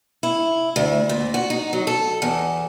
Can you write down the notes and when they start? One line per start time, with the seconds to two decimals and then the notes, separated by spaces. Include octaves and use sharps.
0.23 E4
0.76 D2
1.09 A#2
1.34 F#4
1.50 D#4
1.73 F#3
1.87 A4
2.22 E2